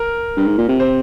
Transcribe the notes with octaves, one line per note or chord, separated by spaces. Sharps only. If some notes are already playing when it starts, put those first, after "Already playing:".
Already playing: A#4
G2
G#2
A#2
C3
C5